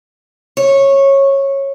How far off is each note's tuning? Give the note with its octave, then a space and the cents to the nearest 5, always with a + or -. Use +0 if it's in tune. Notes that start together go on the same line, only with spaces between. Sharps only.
C#5 -15